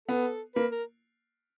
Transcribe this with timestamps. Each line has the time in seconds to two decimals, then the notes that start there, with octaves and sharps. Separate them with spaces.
0.08 B3 A4
0.55 A#3 B4
0.72 A#4